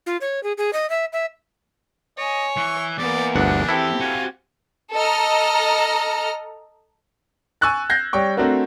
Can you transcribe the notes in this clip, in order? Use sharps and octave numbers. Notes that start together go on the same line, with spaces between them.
F4
C#5
G#4
G#4
D#5
E5
E5
C#5 D#5 G#5
E3 C#6
E2 A#3 B3 D5
G1 D2 D4 F#5
C4 E4 G4 A4
F#4 F5 G#5
A4 D#5 A#5 F6
G#5 C#6 E6 F#6 A6
G6 G#6 A#6 C7
G3 C#5 G5 C#6
A3 C4 D4 F#4 A#4